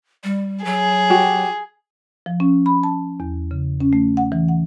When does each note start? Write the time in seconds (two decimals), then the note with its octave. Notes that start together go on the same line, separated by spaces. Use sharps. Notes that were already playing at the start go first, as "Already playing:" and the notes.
0.24 G3
0.65 F#3 G#4
1.10 F#4 G4
2.26 F3
2.40 C#4
2.66 B5
2.83 A5
3.20 E2
3.51 C#3
3.80 C#4
3.93 A3
4.17 F#5
4.32 E3
4.48 F#5